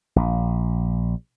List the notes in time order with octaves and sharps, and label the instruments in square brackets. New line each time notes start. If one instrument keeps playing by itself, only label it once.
[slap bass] A#1